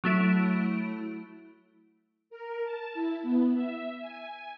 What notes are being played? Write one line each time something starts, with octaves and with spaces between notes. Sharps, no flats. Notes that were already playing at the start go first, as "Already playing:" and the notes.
F#3 A3 E4 D7
A#4
A5
E4
B3
E5
G#5